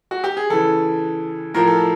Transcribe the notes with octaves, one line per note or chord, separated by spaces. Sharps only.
F#4
G4
G#4
C#3 E3 A4
A2 F3 A#4
A4